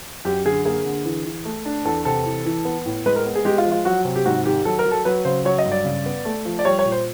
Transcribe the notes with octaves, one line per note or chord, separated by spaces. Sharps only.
F#2 G4
D3 G#4
A#3 G#4
D3
E3
E3
A3
D4
E2 A4
C3 A4
E3
E3
B3
A2
G#3 B4
A#4
B3
G#4
G#3 G4
F4
F3
F4
F#3 F#4
C3
G4
G#2 F#4
D#3 G4
F#3 A4
A#4
F#3
A4
F#3 B4
C#3 C5
F#3 C#5
D#5
G2
D5
C#3
B3
A3
F3
D5
G3 C#5
C#5
A#2
C5